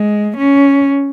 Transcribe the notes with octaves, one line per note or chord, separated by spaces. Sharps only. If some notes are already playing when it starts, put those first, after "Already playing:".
Already playing: G#3
C#4